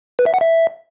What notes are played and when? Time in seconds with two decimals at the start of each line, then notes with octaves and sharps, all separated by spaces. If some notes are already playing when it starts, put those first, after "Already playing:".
0.19 B4
0.26 E5
0.34 F#5
0.41 E5